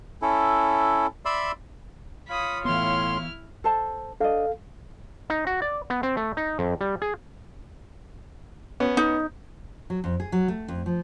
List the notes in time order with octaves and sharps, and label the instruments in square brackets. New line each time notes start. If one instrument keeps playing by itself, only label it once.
[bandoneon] C#4 E4 A4
D5 E5 B5 C6 E6
[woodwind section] F4 C#5 F5 [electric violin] B5 D#6
[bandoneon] A2 C6 [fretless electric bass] E3 B3 [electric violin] E4 F6
[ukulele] A4 C5 A5
[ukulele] D4 D#5 [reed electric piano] A4 F5
[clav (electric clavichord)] D#4
F#4
D5
B3
C4
A3
D#4
F2
G3
G#4
[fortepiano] B3 C#4
[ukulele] D#4
[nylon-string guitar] F#3
F2
G#4
F#3
A3
F2
F3